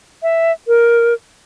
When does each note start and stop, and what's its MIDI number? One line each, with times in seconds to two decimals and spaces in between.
0.23 0.52 76
0.67 1.14 70